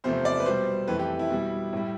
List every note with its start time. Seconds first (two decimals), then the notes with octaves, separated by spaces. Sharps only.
0.04 E2 C3 F3 A3 C5
0.25 D5
0.40 B4
0.46 B2 G3 C5
0.88 F2 E3 A3 B4
0.99 G4
1.19 E4
1.30 B2 G3
1.73 A2 G3